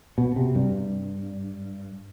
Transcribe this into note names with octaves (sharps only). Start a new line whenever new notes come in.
B2
C3
G2